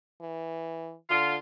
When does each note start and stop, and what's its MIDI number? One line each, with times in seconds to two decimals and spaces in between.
0.22 0.95 52
1.10 1.36 50
1.10 1.35 65